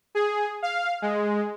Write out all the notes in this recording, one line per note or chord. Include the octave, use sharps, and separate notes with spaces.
G#4
F5
G#3